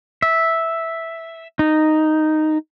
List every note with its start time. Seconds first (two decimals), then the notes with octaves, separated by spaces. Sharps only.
0.22 E5
1.59 D#4